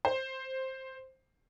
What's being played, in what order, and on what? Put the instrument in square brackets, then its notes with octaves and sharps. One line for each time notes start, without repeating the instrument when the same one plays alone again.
[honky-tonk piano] C5